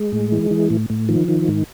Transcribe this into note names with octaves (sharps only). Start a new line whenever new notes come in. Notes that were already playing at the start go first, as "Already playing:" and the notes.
Already playing: G#3
A2
E3
E3
A2
A2
D#3 F3
D#3
G#2